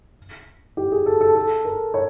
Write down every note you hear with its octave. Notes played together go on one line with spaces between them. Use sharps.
G4
G#4
A4
A4
A4
A#4
C#5